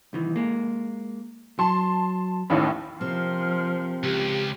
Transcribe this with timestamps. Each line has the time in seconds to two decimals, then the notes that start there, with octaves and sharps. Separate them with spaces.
0.13 C2 D#3 E3
0.36 G#3 A#3
1.59 F#3 A5 C6
2.50 A1 D#2 A2 C#4 B5
3.01 C3 F3 A#3 C4 F6
4.04 C#2 G4